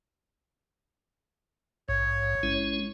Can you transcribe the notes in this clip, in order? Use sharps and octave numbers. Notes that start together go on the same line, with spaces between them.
A#1 G#2 C#5
G#3 C#4 E4